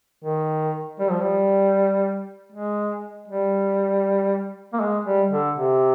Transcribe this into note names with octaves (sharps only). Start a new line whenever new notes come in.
D#3
G3
F3
G3
G#3
G3
A#3
G#3
G3
D3
C3